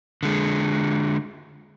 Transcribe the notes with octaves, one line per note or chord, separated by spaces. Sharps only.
D3 G#3